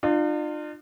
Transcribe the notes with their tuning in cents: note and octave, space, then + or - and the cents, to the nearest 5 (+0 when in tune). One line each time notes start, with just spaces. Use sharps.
D4 +45 F4 +0